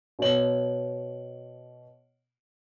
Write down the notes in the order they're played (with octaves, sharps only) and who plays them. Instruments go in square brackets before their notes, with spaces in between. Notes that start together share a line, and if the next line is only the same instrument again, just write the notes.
[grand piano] B2 C#5 F#7